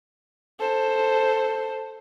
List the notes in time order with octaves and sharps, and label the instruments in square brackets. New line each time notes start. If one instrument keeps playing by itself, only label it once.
[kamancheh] A4 C5